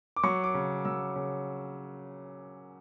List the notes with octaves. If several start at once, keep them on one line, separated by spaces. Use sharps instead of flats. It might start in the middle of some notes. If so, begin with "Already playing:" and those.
D6
F#3 C#6
D6
C#3
F#3 E6
C#3